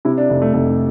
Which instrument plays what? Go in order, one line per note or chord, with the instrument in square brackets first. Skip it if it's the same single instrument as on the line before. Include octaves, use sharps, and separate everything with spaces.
[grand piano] C3 E4
D4
F1
A3
F1 A3